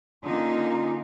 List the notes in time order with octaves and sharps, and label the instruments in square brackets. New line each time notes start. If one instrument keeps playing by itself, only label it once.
[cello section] D3 A#3 D#4 [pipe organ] C#4 F4